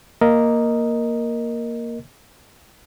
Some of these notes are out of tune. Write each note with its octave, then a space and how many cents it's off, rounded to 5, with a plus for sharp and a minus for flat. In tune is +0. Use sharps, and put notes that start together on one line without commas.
A#3 +0 A#4 +0 D#5 +0